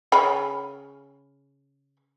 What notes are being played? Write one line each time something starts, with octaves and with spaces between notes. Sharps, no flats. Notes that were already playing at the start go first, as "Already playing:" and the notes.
C#3 G#5 B5